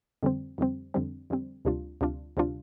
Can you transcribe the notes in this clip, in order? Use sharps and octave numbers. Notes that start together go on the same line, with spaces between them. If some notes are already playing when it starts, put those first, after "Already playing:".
F2 D3 G3 C4
F2 D3 G3 C4
F2 D3 G3 C4
F2 D3 G3 C4
D2 C3 G3 D4 F4
D2 C3 G3 D4 F4
D2 C3 G3 D4 F4